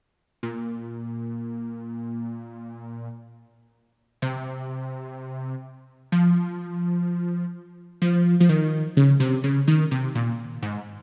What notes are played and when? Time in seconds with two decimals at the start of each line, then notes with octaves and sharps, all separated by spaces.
0.43 A#2
4.22 C3
6.12 F3
8.02 F3
8.40 F3
8.49 D#3
8.97 C#3
9.20 C3
9.44 C#3
9.68 D#3
9.91 C3
10.15 A#2
10.62 G#2